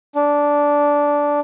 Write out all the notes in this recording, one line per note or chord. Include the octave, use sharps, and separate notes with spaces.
D4